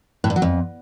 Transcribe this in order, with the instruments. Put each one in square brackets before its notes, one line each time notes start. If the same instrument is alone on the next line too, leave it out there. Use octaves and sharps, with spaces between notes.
[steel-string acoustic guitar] A2
G2
F#3
F2